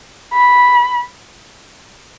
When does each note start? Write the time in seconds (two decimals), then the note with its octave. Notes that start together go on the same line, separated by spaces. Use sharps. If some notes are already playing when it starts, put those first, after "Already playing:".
0.34 B5